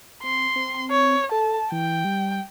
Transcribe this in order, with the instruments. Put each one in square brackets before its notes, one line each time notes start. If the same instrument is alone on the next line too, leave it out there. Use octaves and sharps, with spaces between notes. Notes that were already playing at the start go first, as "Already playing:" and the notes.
[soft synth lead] C4 [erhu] C6
[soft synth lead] C4
[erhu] C#5
[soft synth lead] A4 [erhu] A5
[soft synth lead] E3 [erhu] G5
[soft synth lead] G3